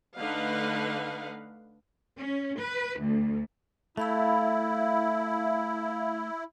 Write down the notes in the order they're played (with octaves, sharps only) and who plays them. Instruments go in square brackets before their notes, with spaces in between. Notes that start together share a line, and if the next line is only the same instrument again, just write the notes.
[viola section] D3 A3 D#4 B4 F5 F#5
[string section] C#4
B4
D2
[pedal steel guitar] A3 [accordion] E4 [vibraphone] E5 F5 B5